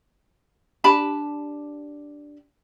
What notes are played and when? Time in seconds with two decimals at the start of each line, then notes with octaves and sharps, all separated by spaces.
0.84 D4 G4 A5 B5